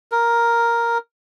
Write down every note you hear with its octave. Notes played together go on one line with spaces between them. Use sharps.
A#4